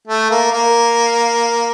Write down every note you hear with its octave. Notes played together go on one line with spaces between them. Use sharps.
A3
A#3
A#3